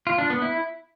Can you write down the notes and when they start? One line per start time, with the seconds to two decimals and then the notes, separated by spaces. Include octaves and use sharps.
0.07 F4
0.18 D4
0.30 B3
0.42 E4